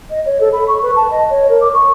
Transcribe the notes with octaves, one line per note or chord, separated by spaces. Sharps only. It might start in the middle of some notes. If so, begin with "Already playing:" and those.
D#5
C#5
A4
B5
C#6
B4
A5
D#5
C#5
A#4
D6
C#6